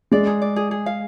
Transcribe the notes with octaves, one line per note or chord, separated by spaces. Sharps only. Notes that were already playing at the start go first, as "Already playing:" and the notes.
G#3 D5
G#4
D5
G#4
G#4
F5